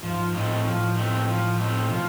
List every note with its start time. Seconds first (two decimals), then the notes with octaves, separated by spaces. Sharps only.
0.03 G#2 F3
0.34 A2 A3 C4 D#4
0.65 A2 F3
0.96 A3 C4 D#4
1.27 F3
1.58 A3 C4 D#4
1.89 B2 F3